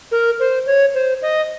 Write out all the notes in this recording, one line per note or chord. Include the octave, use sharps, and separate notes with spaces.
A#4
C5
C#5
C5
D#5